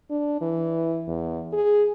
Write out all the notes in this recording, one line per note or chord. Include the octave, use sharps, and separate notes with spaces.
D4
E3
E2
G#4